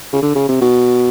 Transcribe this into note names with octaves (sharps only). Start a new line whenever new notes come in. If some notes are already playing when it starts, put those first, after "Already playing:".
C#3
D3
C#3
C3
B2